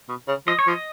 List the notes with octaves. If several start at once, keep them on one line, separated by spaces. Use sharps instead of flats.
B2
C#3
F3 D#5
C#5
F3
D#5